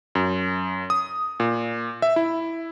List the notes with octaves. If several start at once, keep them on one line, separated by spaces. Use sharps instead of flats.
F#2
D#6
A#2
E5
E4